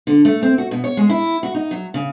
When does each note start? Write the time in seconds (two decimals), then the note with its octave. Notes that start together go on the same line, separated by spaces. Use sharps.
0.07 D3
0.25 A3
0.43 C4
0.58 F#4
0.71 B2
0.84 C#5
0.97 G#3
1.09 E4
1.43 F#4
1.55 D#4
1.71 F#3
1.94 C#3